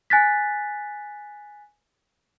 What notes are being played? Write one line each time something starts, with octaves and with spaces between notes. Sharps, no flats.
G#5 F#6 A6 B6